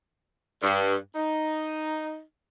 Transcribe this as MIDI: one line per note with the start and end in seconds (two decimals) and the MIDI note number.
0.61 0.94 43
1.14 2.22 63